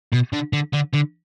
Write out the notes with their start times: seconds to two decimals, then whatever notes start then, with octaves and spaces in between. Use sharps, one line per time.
0.12 B2
0.33 D3
0.53 D3
0.73 D3
0.94 D3